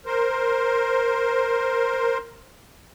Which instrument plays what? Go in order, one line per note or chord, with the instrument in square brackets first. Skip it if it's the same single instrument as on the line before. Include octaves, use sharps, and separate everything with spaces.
[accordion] A#4 C5